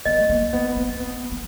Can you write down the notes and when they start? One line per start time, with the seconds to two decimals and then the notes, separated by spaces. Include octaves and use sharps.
0.05 B3 D#5
0.20 A3
0.30 A#3
0.53 B3
0.76 C4
1.00 B3
1.32 B3